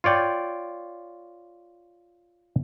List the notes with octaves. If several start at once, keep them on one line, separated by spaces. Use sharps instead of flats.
F4 C#5 D5 G5